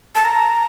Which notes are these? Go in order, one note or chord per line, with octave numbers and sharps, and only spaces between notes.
A5
A#5